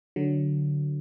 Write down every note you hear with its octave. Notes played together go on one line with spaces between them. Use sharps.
D3 F#3